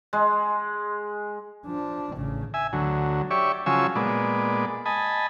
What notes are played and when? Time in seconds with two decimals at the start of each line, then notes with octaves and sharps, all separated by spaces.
0.13 G#3
1.66 F3 D4
2.15 A1 C#3
2.54 E5 G#5
2.73 D2 F#3
3.31 G4 C#5 D5 E5 C#6
3.66 C#3 F3 F#3 G#5 C#6 E6
3.95 A#2 G#3 B3 D5
4.86 D#5 G#5 A5 B5